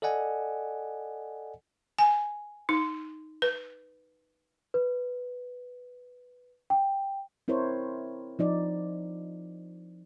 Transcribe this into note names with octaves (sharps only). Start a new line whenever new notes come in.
A4 D5 D#5 F#5 G#5
G#5
D#4
B4
B4
G5
C4 E4 A#4 C5 C#5
F3 D#4 D5